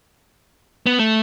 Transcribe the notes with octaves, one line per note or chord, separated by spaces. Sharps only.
B3
A3